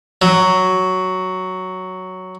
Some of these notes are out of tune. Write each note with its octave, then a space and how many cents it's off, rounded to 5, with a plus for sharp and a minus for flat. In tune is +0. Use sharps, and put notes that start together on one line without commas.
F#3 +5